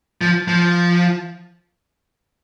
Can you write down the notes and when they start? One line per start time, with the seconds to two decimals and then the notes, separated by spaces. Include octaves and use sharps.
0.21 F3
0.48 F3